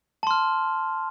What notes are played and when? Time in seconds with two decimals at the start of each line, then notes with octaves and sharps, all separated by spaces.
0.23 A5
0.27 C6
0.31 F6